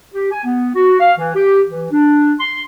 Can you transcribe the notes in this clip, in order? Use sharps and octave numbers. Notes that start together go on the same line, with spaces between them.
G4
G#5
B3
F#4
F5
E3
G4
E3
D4
C6